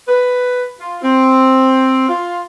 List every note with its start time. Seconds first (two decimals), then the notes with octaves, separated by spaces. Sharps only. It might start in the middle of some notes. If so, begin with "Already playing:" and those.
0.07 B4
0.79 F4
1.02 C4
2.08 F4